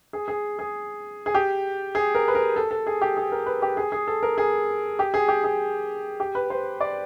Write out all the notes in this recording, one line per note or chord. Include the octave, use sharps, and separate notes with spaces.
G#4
G#4
G#4
G#4
G4
G#4
A#4
B4
A#4
A4
A4
G#4
G4
G#4
A#4
B4
G4
G#4
G#4
A4
A#4
G#4
G4
G#4
G4
G#4
G4
B4
C5
D5